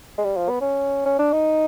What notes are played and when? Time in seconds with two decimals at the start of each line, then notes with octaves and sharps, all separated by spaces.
0.18 G#3
0.25 G3
0.37 F3
0.49 B3
0.61 C#4
1.06 C#4
1.19 D4
1.33 D#4